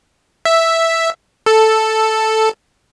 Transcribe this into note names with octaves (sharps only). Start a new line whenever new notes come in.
E5
A4